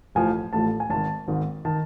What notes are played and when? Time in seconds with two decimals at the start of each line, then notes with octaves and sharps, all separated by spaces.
0.15 A1 A2 F3 G#5
0.53 A1 A2 F3 A5
0.80 G#5
0.90 G#1 G#2 D#3 A5
1.28 G#1 G#2 D#3
1.65 D#3 A5